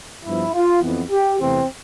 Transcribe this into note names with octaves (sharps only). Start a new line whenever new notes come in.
G2 F3 B3 E4
F4
F2 E3 B3
G4
E2 C3 E3 A3 C4